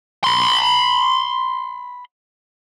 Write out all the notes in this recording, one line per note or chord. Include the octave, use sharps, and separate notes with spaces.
B5 C6